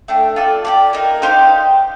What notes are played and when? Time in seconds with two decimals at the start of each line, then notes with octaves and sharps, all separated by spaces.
0.08 A3 D4 G4
0.36 F4 A4 D5
0.65 G4 A#4 D5
0.93 A#3 D#4 A#4
1.22 D#4 G4 C5 F5